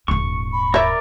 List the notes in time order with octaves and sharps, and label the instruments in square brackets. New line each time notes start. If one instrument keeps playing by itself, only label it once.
[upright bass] D#1 G#2 [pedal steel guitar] C#6
[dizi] B5
[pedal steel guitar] A#4 D5 [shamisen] C#5 E5